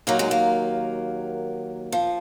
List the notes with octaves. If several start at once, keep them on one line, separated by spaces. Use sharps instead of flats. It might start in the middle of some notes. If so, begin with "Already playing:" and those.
D#2 D#3 F#3 A#3
G#3
A#3
F3